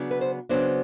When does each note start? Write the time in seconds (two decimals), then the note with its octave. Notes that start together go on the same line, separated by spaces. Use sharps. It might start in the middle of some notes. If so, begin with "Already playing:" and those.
Already playing: C#3 F#3 B3 D4
0.11 B4
0.21 C5
0.49 C#3 F#3 B3 D4 C5